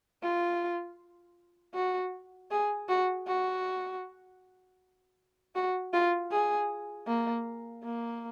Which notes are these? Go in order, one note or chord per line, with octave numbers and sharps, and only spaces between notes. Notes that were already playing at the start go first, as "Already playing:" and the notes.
F4
F#4
G#4
F#4
F#4
F#4
F4
G#4
A#3
A#3